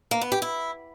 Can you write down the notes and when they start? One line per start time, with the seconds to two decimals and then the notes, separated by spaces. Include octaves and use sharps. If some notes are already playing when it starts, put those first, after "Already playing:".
0.11 A#3
0.21 B3
0.32 G4
0.42 E4